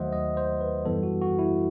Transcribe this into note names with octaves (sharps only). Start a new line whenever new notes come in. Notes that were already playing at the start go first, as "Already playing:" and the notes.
Already playing: D#2 D#3 F#3 A3 C5 D#5 E5 F#5
D#5
C5
B4
F#2 E3 G3 B3 A4
F#4
F#4
E4